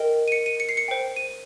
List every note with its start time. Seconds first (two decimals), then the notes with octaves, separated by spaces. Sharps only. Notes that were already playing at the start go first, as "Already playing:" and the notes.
Already playing: A#4 D#5 G5
0.28 D#7
0.32 C#7
0.46 D#7
0.60 C#7
0.69 C7
0.77 C#7
0.88 C5 G5
1.16 D#7